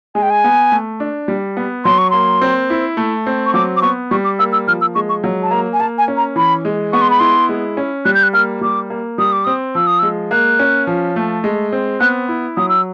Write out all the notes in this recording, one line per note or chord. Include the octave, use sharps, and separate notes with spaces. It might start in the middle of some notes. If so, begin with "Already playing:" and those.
G#3 G#5
G5
G#5
B3
A3
D4
G3
B3
F#3 C6
C#6
A#3 C6
C4
E4
A3
C4
C#6
F#3 D6
D6
B3 C#6
G3 C#6
D6
A#3 E6
E6
F3 F6
E6
G#3 C#6
C#6
F#3
A5
A#3 A#5
G#5
A#3 A5
G#5
C#4
A#5
E3 B5
G#3
B3 C#6
C6
B5
E4 C6
G#3
C#4
G3 F#6
G6
F#6
A#3 F6
G3 D6
A#3
G3 D#6
D6
C4 D#6
F3 E6
D#6
G#3 E6
A#3 F#6
C#4
F3
A3
G#3
C4
B3 F#6
E4
F#3 D#6
E6